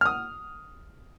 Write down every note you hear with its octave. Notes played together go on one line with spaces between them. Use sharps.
D#6 F6